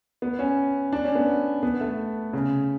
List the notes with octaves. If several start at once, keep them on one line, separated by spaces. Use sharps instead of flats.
B3
C#4
D4
C#4
B3
B3
A3
C#3